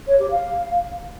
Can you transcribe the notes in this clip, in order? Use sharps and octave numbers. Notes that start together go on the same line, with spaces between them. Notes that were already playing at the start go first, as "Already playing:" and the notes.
C#5
G4
F5